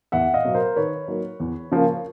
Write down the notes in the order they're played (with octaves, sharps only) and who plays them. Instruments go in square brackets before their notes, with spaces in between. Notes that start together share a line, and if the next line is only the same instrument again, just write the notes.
[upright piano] E2 E5 F#5
D#5 F5
B2 F#3 B3
A#4 C5
D#3 B4 C#5
F#3 A#3 D#4
E2
C#3 F3 A#3